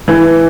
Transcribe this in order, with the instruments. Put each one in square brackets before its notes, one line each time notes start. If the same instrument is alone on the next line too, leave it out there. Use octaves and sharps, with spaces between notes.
[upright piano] E3